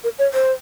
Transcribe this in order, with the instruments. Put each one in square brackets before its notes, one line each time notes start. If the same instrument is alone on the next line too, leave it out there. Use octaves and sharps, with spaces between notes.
[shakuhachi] A#4
C#5
C5